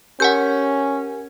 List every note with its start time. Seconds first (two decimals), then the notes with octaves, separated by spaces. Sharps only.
0.20 C#4 G4 A#4 F#5 G#5 G6